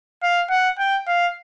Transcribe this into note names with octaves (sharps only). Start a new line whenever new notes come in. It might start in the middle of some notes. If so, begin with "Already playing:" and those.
F5
F#5
G5
F5